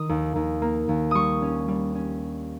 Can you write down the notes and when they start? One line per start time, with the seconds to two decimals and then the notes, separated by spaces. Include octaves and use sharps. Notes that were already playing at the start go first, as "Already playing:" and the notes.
Already playing: D#3 D#6
0.09 D#2
0.36 D#2
0.62 A#3
0.89 D#2
1.11 G3 C#6 D#6
1.42 C#4
1.68 G3
1.95 C#4